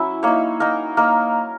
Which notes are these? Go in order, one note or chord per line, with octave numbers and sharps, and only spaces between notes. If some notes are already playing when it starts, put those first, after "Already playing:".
Already playing: F#3 C#4 E4 E5
A#3 D#4 C#5
A#3 D#4 A#4
A#3 D#4 A#4